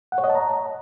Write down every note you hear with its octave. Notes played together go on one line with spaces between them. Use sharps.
F#5
C#5
D#5
A5
A#5